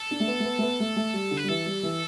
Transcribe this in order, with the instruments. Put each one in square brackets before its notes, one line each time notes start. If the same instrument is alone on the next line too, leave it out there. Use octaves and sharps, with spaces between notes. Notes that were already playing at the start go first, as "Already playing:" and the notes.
Already playing: [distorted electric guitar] A4
[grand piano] D4
A3
B3
A3
B3
A3
B3
A3
A3
G3
D3
[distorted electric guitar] B4
[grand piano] G3
[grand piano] E3 [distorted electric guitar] A4
[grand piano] G3
E3